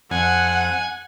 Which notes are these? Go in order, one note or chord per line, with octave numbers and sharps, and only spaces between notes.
F2 F#5 G#5